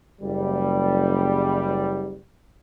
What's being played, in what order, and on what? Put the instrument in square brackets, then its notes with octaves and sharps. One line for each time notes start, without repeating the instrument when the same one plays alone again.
[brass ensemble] F#1 G3